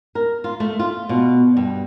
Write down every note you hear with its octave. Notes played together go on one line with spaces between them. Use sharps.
A#4
F4
A3
F4
B2
G2